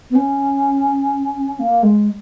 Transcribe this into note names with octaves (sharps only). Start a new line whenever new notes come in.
B3
C#4
A#3
G#3